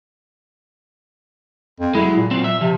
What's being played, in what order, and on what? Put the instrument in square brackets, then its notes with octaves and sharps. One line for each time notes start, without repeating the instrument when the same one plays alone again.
[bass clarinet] F2
[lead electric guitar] F#3 G#3 [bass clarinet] E4
[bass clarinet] A#2
[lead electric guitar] F#3 C4
E5
[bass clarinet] C3 [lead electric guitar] F3